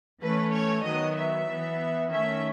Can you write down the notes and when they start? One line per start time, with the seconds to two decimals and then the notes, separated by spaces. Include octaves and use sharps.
0.21 E3 A3 C#4 B4
0.53 C#5
0.84 D#3 F#3 B3 D#5
1.16 E5
1.48 E3 B3
2.11 D#3 A3 C#4 E5